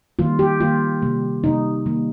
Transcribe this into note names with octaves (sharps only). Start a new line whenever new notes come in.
D#3 G3 A#3 F4
G4
D#3 G3 A#3 F4
C3 G3 A#3
C3 G3 A#3 D#4
D#3 G3 A#3